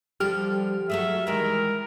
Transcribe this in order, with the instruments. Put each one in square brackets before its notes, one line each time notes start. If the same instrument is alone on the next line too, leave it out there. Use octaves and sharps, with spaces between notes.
[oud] D3 F3 G3 [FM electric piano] G4 F6
[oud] F#3 A3 G#4 [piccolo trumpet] E5
[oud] D#3 E3 G#3 [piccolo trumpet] A#4